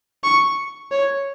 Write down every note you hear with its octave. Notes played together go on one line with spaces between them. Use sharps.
C#6
C#5